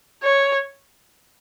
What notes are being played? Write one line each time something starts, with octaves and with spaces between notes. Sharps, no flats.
C#5